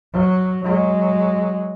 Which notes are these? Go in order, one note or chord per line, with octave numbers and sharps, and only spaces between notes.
F#3
F#3 G#3